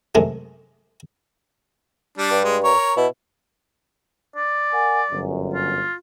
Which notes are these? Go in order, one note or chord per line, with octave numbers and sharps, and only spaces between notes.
F#2 C3 G#3 A3
G3 D4
G2
G#3
A#4 C#5
B2 E4
D5
A#4 F#5 G#5
G1 F#2
F4